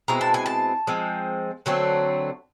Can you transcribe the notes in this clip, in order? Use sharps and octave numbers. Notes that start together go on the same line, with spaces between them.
B2 G#3 C4 E4 A#5
A5
G#5
A5
F3 G#3 C4
D3 F#3 A3 C4